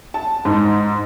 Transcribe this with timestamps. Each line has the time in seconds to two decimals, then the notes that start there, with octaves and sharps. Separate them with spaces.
0.14 A5
0.45 G#2